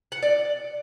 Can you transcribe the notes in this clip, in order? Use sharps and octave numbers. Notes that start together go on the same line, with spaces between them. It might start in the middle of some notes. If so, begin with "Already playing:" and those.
F#5
D5